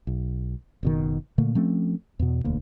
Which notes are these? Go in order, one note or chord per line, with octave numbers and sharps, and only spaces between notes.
B1
F#1 B2 D#3
A#2 D3 A3 A#3
F3 A3 C4 C#4
E2 B2
E1 D2 A#3